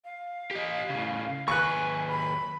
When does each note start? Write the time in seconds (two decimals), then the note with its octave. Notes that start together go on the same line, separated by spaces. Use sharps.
0.05 F5
0.51 G4 D#5
0.90 A2 C#3
1.48 D#2 B4 G#5 C#6 F#6
2.08 B5